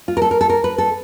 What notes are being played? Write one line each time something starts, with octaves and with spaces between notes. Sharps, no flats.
F4
A#4
A4
A#4
A4
A#4
B4
A4